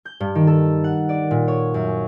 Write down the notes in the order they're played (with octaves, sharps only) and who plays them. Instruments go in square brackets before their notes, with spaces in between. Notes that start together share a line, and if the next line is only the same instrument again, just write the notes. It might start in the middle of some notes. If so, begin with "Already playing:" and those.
[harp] G6
G2
D#3
A4
F#5
D5
A#2
C#5
F#2